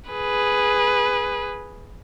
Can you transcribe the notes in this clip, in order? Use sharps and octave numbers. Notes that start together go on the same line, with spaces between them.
G#4 B4